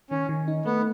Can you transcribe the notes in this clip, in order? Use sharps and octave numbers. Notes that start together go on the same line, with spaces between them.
D#3 C#4
D#3
D#4
A3 B3